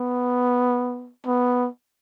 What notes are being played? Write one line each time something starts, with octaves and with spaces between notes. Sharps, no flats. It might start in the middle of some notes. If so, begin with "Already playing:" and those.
Already playing: B3
B3